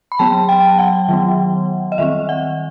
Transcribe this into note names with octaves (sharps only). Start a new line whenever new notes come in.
B5
F#3 B3 A5
G5
F#5
D#3 F#3 B3
D#5
D#3 G3 C4 E5
F#5